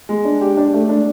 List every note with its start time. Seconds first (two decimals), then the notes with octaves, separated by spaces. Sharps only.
0.09 G#3
0.25 D4
0.41 G4
0.57 D4
0.73 A3
0.89 D4